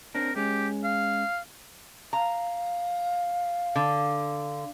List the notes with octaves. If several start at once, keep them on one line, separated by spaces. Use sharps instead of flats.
C4 D4 A#4
G#3 C#4 G4
F5
F5 A#5
D3